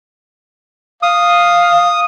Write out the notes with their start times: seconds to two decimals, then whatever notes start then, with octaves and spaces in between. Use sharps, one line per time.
1.03 F5 D#6